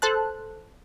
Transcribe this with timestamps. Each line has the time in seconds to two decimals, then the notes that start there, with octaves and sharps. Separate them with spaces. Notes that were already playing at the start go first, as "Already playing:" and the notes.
0.02 A4 C5 A5 F#6